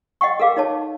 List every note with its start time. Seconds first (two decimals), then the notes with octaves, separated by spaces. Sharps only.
0.21 D#5 F#5 G5 C#6
0.40 A4 A#4 F5 D6
0.56 D#4 C#5 A5